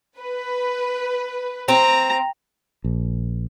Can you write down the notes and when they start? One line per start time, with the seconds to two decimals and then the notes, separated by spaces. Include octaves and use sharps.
0.19 B4
1.68 C4 A#5
2.84 A#1